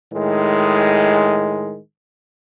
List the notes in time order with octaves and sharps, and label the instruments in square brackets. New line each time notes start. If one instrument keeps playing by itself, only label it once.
[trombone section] A2 D#3 G#3